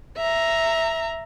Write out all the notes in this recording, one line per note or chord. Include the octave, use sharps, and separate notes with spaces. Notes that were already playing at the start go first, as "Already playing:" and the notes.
E5 A#5